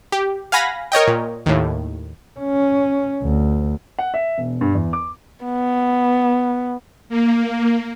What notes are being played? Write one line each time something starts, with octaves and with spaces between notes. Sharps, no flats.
G4
F5 F#5 G#5 B5 A#6
A#4 C#5 D#5 G5
A#2
D#2 A2
C#4
D2
F#5
E5
E1
G2
E2
D6
B3
A#3